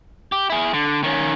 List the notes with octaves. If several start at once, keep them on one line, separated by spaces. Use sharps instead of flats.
G4
E4 G#4
D3
D#3 C#4